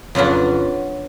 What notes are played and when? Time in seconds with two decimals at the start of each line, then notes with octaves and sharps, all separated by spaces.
0.15 F2 C#3 F#3 B3 D4